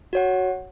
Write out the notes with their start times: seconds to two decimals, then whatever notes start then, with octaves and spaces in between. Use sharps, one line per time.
0.13 F#4 C#5 F#5